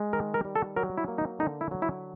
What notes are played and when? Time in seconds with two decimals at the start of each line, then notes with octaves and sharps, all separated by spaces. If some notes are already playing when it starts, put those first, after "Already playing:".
Already playing: G#3
0.13 D#3 A#4
0.34 A#4
0.45 G3
0.55 A4
0.76 F#3 A#4
0.98 E4
1.08 A#3
1.18 D#4
1.39 D3 D#4
1.61 E4
1.71 F#3
1.82 E4